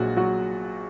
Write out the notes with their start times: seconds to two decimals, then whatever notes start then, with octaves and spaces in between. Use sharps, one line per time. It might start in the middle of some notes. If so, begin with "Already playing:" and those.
Already playing: A#1 A#2 F#3 G#3 F#4
0.17 F#3 F#4